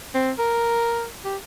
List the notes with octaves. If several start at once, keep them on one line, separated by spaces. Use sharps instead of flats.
C4
A#4
G4